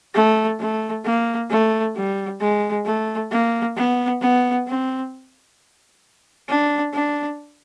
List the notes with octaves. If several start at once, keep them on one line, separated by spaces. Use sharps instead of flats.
A3
A3
A#3
A3
G3
G#3
A3
A#3
B3
B3
C4
D4
D4